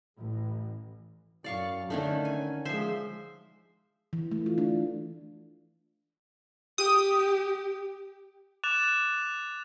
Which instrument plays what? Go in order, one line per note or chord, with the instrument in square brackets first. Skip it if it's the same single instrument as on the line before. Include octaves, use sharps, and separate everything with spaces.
[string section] A1
[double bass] F#2 [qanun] D5 F5 C#6
[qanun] D3 D#3 A3 [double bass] C#4
[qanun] G#5
[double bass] F3 G#3 [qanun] C5 E5 C6
[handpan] E3
A3
F4
D4
[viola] G4 [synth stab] D#6
[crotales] D6 F#6 A6 E7 F7